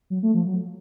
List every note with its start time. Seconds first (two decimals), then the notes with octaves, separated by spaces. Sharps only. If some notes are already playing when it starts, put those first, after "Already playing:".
0.10 F#3
0.23 A3
0.34 F3
0.46 F#3